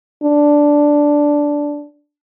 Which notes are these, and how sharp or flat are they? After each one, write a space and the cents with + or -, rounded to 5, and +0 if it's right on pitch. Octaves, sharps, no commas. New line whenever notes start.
D4 -5